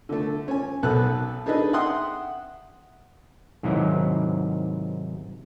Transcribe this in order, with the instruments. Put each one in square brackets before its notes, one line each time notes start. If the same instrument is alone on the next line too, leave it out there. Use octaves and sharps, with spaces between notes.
[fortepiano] D3 A3
C#4 G#5
B1 B3 A4 F#6
D4 D#4 G#4 A4 B4 D#5
E5 F#5 G5 C6 D#6 F#6
[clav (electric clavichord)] G#2 C3 D#3 F#3 E4